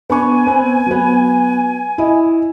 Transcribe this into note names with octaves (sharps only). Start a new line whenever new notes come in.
B3 D4 G#5 C#6
B3 C4
F#3 B3
E4 D#5